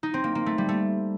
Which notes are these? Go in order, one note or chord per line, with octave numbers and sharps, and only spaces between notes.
D#4
C4
A#3
A#3
A3
G3
A3